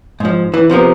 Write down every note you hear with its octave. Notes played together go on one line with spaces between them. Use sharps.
G#2 F3
E3
C3 F3 B3 A#4